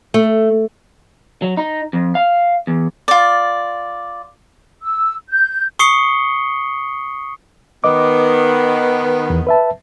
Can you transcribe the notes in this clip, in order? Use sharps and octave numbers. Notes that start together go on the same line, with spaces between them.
A3
F#3
D#4
F2
F5
E2
F4 D5
E6
G6
C#6 D#6 C7 C#7 G7
D#3 B3 D#5 D6
E2
B4 E5 A5